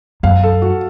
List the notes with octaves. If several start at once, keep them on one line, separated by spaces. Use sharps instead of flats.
F#2 F5
A4
F#4